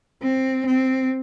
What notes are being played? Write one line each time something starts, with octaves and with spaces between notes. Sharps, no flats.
C4
C4